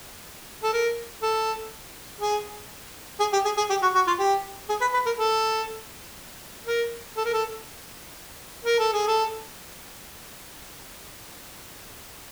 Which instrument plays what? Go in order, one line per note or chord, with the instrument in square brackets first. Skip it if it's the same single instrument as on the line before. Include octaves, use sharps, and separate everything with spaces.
[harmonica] A4
A#4
A4
G#4
G#4
G4
G#4
G#4
G4
F#4
F#4
F4
G4
G#4
B4
B4
A#4
A4
A#4
A4
A#4
A4
A#4
A4
G#4
A4